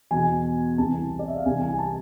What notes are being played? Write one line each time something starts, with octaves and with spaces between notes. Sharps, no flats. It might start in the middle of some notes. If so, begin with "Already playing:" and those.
E2 B2 G#5
C2 C3 E3 A5
D5
E5
F5
C2 C3 E3 G#5
G#5
A5